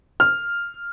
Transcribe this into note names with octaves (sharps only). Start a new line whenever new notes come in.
F6